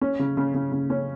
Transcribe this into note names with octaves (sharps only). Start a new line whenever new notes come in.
C#4
C#3
C#3
C#3
C#3
C#4